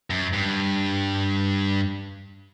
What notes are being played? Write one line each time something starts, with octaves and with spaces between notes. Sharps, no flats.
F#2
G2